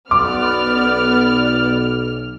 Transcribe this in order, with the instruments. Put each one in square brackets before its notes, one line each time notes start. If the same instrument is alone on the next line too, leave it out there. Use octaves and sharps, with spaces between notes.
[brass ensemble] B1 [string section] B3 D5 [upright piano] D6 [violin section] F6